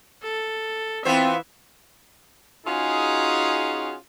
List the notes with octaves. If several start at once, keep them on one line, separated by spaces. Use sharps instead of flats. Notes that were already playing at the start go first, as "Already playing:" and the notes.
A4
E3 B3 C4 F4 C5 E5
C#4 D#4 F4 F#4 G#4